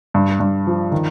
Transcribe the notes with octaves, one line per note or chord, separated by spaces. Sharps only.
G2
G2
F3
D#3